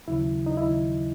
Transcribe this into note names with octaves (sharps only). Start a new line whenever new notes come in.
D#2 C#3 F#3 E4
D#4
D#2 C#3 F#3 E4